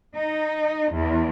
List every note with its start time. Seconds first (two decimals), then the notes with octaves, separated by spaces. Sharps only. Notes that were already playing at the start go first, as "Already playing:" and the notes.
0.15 D#4
0.92 E2